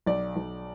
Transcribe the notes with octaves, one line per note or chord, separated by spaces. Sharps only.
B1 D5
B1